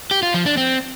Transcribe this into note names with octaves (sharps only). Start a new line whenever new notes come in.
G4
F4
F3
D4
C4